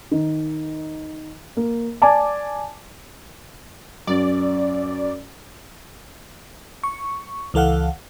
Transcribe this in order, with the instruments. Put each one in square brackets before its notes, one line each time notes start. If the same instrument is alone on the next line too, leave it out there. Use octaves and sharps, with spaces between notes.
[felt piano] D#3
A#3
D5 G#5 A5 D6
[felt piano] F#2 [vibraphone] C#4 [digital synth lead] D5
[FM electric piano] C#6
C#2 E3 A4 F5 F#5